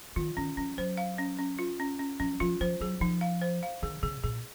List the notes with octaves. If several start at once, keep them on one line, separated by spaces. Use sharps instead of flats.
D#3 F4
D#3 C#4
F3 C#4
F#3 C5
F5
C#4
C#4
F4
C#4
C#4
F3 C#4
F3 F4
F3 C5
F#3 G#4
F3 D#4
F5
C5
F5
D#3 G#4
C#3 G#4
A#2 G#4